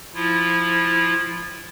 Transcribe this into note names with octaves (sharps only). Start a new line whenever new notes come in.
F3 E4 F4